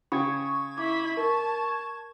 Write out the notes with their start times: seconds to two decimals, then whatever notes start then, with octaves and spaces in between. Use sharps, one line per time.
0.12 C#3 G5 B5 C#6 G#6
0.78 E4 B5 D6
1.17 A#4 A5